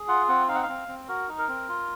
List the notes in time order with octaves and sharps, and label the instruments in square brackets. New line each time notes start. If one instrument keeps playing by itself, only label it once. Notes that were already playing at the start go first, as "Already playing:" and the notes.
Already playing: [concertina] G#4
F4 F#5
C4 F#5
D#4 F5
F#5
F5
C4
C4
F#4 A#4
D#4
A#4
C4
F4